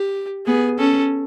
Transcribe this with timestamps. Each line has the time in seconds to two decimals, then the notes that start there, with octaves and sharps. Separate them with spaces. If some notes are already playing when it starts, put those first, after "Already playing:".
Already playing: G4
0.46 B3 G#4
0.79 C#4 A4